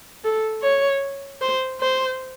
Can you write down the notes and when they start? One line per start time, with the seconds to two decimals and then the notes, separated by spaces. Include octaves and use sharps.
0.24 A4
0.62 C#5
1.41 C5
1.80 C5